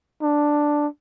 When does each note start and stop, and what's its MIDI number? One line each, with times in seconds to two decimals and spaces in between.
0.22 0.87 62